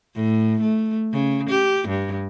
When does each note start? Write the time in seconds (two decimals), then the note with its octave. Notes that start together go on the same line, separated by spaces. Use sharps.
0.15 A2
0.61 A3
1.13 C#3
1.50 G4
1.88 G2